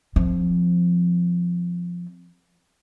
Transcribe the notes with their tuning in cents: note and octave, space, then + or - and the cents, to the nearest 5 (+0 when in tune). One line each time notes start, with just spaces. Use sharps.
F3 +5 C4 +0